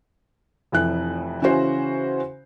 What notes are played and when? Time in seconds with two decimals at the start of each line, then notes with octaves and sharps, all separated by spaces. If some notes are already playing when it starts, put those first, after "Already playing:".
0.72 F1 F2 E3 F#6
1.42 C#3 E3 C#4 F#4 C5